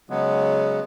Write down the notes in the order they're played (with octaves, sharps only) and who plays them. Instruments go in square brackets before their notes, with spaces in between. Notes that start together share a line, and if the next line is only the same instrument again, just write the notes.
[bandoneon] C#3 F#3 G#3 B3